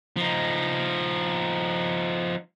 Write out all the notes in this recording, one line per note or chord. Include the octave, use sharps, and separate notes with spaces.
F3 D#4